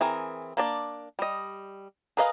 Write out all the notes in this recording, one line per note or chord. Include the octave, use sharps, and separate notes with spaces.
E3 C4 G#4 A#4
A#3 D4 D5
G3 D#5
G#4 A#4 B4 D#5 F5